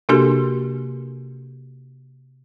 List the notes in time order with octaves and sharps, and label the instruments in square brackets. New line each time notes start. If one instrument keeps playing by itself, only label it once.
[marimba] C3 A#3 D4 F#4 G4 A4